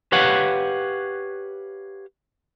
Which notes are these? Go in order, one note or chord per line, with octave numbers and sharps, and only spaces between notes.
G4 B4 C#5 F5 F#5